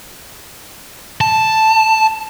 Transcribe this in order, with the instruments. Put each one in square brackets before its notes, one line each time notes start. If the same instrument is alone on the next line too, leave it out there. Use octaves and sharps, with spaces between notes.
[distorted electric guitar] A5